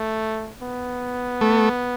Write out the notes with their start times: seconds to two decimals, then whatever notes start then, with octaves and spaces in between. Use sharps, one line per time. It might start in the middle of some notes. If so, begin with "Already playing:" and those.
Already playing: A3
0.62 B3
1.41 A3